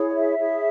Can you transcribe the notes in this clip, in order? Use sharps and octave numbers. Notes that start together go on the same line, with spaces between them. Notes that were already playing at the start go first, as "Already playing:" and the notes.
Already playing: E4 G#4 C#5
D#5
E5
E4 G#4 C#5